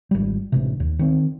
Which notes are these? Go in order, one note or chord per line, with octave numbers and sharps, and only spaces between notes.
G#1 G3
A1 C3
D#2
D#3 C4